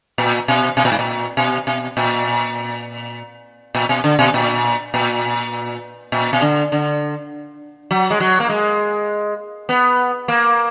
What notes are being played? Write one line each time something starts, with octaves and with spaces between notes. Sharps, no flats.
A#2
B2
B2
A#2
G#2
A#2
B2
B2
A#2
A#2
B2
D3
B2
A#2
A#2
A#2
B2
D3
D3
F#3
G#3
F#3
A#3
G#3
B3
A#3